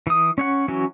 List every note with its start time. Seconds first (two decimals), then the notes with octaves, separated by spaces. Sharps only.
0.07 E3 D#6
0.38 C#4 C#5 F#5
0.68 E3 F#3 C#4 F#4